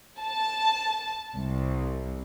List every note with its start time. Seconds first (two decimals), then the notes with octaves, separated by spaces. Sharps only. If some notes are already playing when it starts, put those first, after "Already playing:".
0.18 A5
1.35 C2